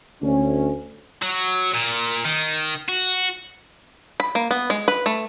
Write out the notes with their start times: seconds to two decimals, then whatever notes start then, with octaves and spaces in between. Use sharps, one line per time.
0.22 D2 C#4
1.22 F#3
1.74 A#2
2.25 D#3
2.88 F#4
4.20 B5
4.35 A#3
4.51 B3
4.70 G#3
4.88 B4
5.06 A3